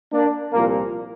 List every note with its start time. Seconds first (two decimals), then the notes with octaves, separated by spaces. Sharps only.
0.13 A#3 D4
0.53 C2 A#2 F3 A#3